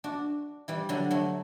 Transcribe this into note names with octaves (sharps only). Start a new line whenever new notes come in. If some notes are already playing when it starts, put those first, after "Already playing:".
D4 F#4
E3 G3
D3 F#3
F#3 A3